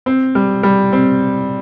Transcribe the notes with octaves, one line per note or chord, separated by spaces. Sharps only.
C4
G3
G3
C4